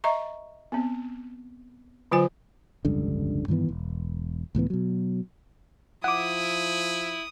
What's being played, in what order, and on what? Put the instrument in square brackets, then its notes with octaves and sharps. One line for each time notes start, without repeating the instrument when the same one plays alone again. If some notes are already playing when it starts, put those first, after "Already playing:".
[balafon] D#5 E5 A#5 C#6
B3 C4
D3 F#3 F4 C5 G#5
[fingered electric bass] F1 C#2 G2 D3
G2 D#3 E3 B3
E1
C#2 A2 E3 B3
B2 F#3
[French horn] F3 [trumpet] E4 [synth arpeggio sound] F#5 D6 [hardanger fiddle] D#6